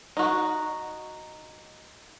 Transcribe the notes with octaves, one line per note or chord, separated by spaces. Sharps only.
D#4 F#4